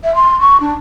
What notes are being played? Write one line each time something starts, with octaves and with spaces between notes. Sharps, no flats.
E5
C6
C#6
D4